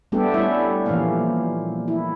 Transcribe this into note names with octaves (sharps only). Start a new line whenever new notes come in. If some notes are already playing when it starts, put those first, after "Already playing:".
G3 A3 B3 D4 G4 A4
G3 C#4 D4 E4 E5
A#2 E3 F3 A#3 C#4 F5
E4